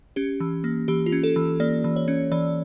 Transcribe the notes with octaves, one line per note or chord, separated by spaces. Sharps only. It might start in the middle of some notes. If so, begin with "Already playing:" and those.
C#4 G4
E3
A#3
E3 G4
F4
C#4
A4
E3
A#3 D5
E3
C#5
C#4
E3 D5